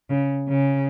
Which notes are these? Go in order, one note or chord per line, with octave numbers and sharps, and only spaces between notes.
C#3
C#3